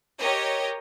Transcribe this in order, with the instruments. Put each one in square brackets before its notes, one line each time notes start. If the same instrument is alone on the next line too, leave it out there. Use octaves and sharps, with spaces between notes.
[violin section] G4 A#4 C#5 D#5